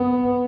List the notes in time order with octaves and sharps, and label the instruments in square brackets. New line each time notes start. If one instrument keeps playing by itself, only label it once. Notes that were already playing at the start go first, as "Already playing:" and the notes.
Already playing: [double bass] B3